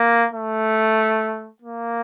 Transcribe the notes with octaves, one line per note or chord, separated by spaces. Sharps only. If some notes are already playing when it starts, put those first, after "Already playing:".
Already playing: A#3
A3
A#3